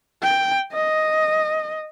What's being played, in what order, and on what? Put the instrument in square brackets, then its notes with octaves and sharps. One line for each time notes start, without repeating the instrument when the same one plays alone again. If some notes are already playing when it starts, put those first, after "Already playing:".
[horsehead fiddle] G5
D#5